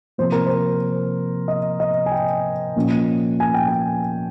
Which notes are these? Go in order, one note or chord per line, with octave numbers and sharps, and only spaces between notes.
C3 F3 A#3 C5
A#4
C5
D#5
D#5
G#5
G5
A#2 F3 A#3 C#4
G#5
G5
G#5